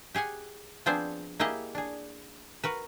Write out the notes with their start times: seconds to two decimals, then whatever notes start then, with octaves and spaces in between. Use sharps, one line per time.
0.14 G4 G#4 F#5 G#5
0.86 F3 B3 C4 D4 G#4 C5
1.40 A#3 E4 G4 G#4 D#5
1.75 D4 G#4
2.64 F#4 A#4 B4